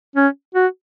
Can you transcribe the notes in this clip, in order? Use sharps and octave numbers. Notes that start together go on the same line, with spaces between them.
C#4
F#4